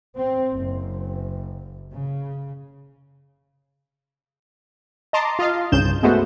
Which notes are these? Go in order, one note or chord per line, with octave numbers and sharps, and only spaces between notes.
C4
F#1
C#3
D#5 A5 A#5 C6 D6
F4 D#5 F5
C2 G2 C#3 G6 E7
G#3 A3 B3 F#4 C5